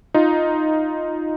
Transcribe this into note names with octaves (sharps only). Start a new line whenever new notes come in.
D#4 F4